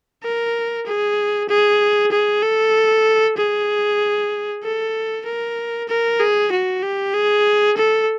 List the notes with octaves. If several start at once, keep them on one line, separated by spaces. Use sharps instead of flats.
A#4
G#4
G#4
G#4
A4
G#4
A4
A#4
A#4
G#4
F#4
G4
G#4
A4